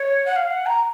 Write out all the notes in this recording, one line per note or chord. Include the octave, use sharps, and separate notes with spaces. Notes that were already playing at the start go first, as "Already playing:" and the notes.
Already playing: C#5
F#5
F5
F#5
A#5